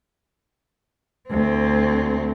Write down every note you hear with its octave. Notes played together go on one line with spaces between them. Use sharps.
D2 C4